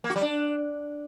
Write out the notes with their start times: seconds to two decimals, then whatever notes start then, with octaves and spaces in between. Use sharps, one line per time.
0.04 A#3
0.10 F#4
0.16 G3
0.21 D4